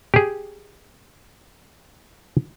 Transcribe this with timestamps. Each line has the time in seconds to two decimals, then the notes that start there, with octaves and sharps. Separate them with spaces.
0.14 G4 G#4